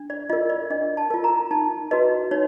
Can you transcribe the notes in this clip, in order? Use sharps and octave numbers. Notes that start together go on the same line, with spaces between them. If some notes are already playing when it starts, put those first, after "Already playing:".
Already playing: D4
D5
F4 A#4 D#5
D5
D4 D#5
A5
F4 A#4
A#5
D#4 A5
F#4 B4 D#5
D#4 C#5